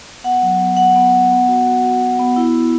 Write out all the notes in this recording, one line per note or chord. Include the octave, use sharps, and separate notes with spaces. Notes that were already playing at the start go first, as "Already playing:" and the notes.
B3 F#5
F#3
B3
F#3 F#5
B3
B3
B3
F#4
F#4
F#4
F#4
B3
E4
E4